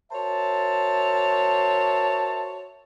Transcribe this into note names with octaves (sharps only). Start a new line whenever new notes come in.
F#4 A#4 C5 C#5 E5 A5